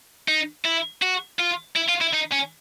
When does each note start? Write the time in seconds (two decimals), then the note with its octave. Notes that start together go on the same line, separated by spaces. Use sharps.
0.28 D#4
0.65 E4
1.02 F#4
1.39 F4
1.76 E4
1.89 F4
2.02 E4
2.14 D#4
2.33 C#4